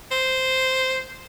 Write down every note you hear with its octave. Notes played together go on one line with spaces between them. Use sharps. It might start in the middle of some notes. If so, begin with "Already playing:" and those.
C5